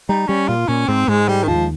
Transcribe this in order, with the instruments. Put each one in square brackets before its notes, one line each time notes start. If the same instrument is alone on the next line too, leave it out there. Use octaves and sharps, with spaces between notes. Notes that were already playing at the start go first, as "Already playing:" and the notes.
[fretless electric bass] G3 [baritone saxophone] D#4
[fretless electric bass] G3 [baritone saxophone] C#4
[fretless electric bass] A#2 [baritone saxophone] F4
[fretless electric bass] A#2 [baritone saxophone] C#4
[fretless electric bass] G#2 [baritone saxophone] C4
[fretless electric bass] G#2 [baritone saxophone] G#3
[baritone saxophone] G3 [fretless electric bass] G#3
[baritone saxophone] D#3
[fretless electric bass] D#2 [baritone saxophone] F3